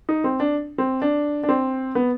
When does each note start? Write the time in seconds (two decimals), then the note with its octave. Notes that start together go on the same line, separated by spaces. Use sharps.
0.09 D#4
0.24 C4
0.40 D4
0.78 C4
1.02 D4
1.43 D4
1.49 C4
1.95 B3